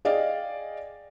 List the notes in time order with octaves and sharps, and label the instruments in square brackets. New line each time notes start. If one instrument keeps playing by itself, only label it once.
[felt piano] G#4 D5 D#5 F5 G5